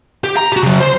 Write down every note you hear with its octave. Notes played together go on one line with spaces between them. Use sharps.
G4
A#5
F#4 G4
C#3 F#3
C5 C6